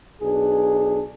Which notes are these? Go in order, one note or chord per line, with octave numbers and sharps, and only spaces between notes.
B1 D4 G#4